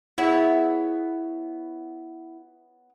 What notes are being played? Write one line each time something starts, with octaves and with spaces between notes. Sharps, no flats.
B3 E4 G#4 C#5